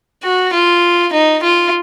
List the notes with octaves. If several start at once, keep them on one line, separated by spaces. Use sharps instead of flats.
F#4
F4
D#4
F4